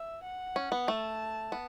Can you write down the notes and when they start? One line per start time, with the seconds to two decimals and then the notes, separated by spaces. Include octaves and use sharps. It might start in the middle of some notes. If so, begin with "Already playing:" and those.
Already playing: E5
0.23 F#5
0.56 C#4
0.72 B3
0.87 A3 A5
1.52 B3